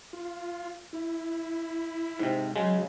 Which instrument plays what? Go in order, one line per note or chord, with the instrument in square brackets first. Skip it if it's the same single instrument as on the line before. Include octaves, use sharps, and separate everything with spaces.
[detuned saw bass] F4
E4
[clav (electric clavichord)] G#2 C3
[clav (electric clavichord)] C#3 G#3 [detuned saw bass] F#3